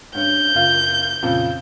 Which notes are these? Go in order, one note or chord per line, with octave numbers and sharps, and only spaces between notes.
G2 C#4 G6
F#1 F4
F2 A#2 C#3